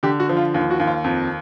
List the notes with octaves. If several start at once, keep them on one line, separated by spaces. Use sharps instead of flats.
D3 G4
F#4
F3
F4
D#2
F#4
D#2
F4
F2